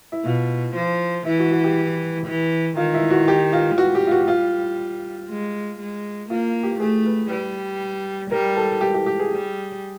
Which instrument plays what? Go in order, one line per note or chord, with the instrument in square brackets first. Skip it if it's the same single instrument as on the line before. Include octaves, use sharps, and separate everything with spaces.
[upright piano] E4
[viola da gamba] B2 [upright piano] F4
[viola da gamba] F3
[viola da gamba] E3 [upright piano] E4
[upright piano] F#4
F#4
G4
[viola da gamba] E3
[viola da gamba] D#3 [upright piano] F4
[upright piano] E4
F#4
G4
F4
[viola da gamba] G3 [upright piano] F#4
[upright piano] G4
F4
F#4
F4
[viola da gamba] G#3
G#3
[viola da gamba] A#3 [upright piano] F4
[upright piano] G4
[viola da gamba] A3 [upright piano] G#4
[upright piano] B4
[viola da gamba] G3 [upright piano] B4
[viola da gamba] G3 [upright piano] A#4
[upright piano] A4
G4
G4
G4
G#4
[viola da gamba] G3